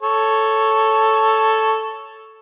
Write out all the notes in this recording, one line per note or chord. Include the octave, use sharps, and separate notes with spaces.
A4 C#5